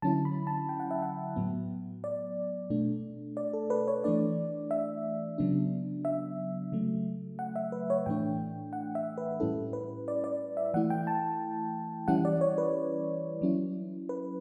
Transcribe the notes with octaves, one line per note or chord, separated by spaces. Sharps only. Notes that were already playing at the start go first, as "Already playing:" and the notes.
D3 F#3 C#4 E4 A5
B5
A5
G5
F#5
E5
F#5
A2 F#3 B3
D5
B2 A3 D4
D5
A4
B4
C#5
E3 A3 D4 D5
E5
C#3 F#3 B3 D4
E5
C#3 F#3 A3
F#5
E5
B4
C#5
A2 E3 A3 D4 G5
F#5
E5
B4
A2 G3 C#4 E4 A4
B4
D5
D5
E5
E3 A3 E4 F#5
G5
A5
E3 G3 C#4 E4 F#5
D5
C#5
B4
F#3 C#4 E4
B4